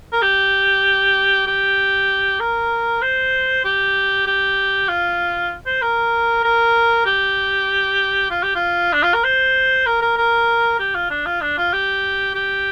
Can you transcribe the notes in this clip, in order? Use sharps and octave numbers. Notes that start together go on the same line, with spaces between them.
A#4
G4
G4
A#4
C5
G4
G4
F4
C5
A#4
A#4
G4
F4
G4
F4
D4
F4
A#4
C5
A#4
A#4
A#4
G4
F4
D4
F4
D4
F4
G4
G4